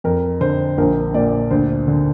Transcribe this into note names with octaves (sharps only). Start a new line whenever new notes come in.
F2 A#4
D3 C5
A#1 A#4
A#2 D5
D2 C5
D3